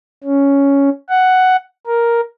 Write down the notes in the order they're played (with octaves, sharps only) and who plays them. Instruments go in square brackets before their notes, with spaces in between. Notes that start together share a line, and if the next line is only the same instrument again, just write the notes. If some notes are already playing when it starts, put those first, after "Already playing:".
[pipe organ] C#4
F#5
A#4